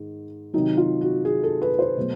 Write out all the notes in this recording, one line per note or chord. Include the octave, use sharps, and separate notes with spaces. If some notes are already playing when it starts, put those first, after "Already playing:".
Already playing: G#2 D#3
C3 D#3 F#3 D#4
F4
F#4
G#4
A4
B4
C5
B2 F#3 A3